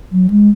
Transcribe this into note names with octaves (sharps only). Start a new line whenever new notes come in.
F#3
G#3